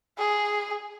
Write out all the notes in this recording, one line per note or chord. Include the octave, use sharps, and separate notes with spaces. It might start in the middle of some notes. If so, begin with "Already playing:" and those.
G#4